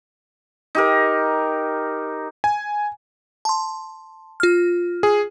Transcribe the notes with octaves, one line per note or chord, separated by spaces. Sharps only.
D#4 G4 A#4
G#5
A5 C6
F4 F6
G#4